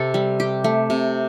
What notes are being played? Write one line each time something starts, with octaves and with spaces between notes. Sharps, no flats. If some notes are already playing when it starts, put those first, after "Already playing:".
Already playing: C3 C4 A4
G3
G4
A3
C3